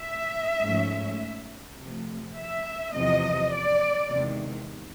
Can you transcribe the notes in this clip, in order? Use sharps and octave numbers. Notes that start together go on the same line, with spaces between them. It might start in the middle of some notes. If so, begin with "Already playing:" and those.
Already playing: E5
G#2 F3 A3 C#4
C3 F3 A3
E5
E2 C3 F3 D#5
D5
E2 C3 D#3 G#3